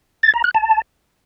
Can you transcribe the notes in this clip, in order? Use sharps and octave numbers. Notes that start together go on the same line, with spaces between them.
A6
A#5
F#6
A5